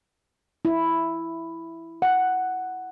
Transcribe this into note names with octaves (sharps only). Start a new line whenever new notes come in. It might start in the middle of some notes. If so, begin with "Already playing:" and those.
E4
F#5